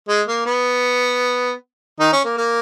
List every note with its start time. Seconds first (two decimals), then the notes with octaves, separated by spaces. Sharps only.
0.09 G#3
0.27 A#3
0.46 B3
2.00 D#3 D#4
2.12 C#4
2.25 A#3
2.38 A#3